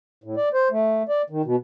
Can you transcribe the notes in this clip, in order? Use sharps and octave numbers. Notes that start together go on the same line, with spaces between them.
A2
D5
C5
A3
D5
D#3
B2